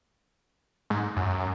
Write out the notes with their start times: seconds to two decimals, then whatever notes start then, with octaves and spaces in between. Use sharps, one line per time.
0.90 G#2
1.16 F#2